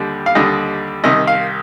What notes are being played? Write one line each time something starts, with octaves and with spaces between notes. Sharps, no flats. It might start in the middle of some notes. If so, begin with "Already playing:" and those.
Already playing: D#2 D3 G3
F5
D#2 D3 G3 D#5
C2 C3 D#3 D#5
F5